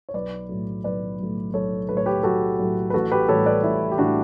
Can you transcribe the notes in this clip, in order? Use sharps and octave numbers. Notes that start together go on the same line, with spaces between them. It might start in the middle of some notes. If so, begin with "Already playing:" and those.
C#5
B1 B4 D5
A2 F#3 A3
B1 B4 D5
A2 F#3 A3
B1 A4 C#5
A2 F#3 A3 B4
C#5
G4 B4
B1 F#4 A4
A2 F#3 A3
B4
A1 F#4 A4
G4 B4
A2 E3 G3 A4 C#5
B4 D5
A1 E4
G4
A2 E3 G3 D4 F#4